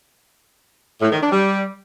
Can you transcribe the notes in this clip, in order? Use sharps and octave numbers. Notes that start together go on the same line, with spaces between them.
A2
D#3
D4
G3